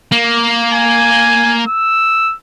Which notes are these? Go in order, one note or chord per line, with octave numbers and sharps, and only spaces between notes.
A#3
G#5
E6